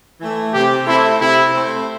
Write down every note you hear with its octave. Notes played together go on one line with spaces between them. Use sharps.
E3 A3
C3 G4
A3 C4 E4 A4 C5
C3 E4
A3 C4 A4 C5